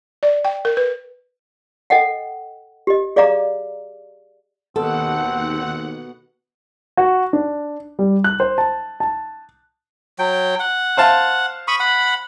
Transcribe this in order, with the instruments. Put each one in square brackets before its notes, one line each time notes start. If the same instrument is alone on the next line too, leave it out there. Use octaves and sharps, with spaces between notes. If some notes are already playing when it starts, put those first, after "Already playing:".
[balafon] D5
G5
A#4
B4
[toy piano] A4 D#5 F#5 G5
G4 D#5
G#4 D5 D#5 F5 A#5 D6
[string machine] D#2 F#5 [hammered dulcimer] B2 [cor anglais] C4 [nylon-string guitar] A4
[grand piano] F#4
D4
G3
F#6
C5
A5
A5
[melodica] F#3 G5
F#5
[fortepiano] C5 F5 A5
[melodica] B5 C#6 D#6
F#5 B5